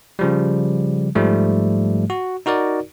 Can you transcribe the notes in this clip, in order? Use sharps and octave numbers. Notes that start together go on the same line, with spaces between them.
C#3 F3 G3
G#2 F3 G3 A3
F#4
D#4 F#4 A#4 D5